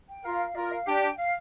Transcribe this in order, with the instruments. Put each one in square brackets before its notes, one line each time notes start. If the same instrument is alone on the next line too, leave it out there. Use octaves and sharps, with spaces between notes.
[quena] G5
[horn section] F4 A#4 [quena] F5
[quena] F5
F5
[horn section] F4 A#4 [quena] D5
[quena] F5
[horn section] D4 G4 [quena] G5
[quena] F5